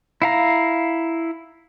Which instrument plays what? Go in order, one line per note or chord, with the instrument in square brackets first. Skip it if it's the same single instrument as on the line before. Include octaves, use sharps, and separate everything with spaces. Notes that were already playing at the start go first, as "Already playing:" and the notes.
[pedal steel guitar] E4 F5 A#5